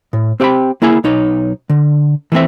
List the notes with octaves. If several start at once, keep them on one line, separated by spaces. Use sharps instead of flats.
A2
C4 G4 F5 G5 B5
A#3 E4 G#4 G#5
B1 D#4 C#5
D3
E3 A3 C4 E5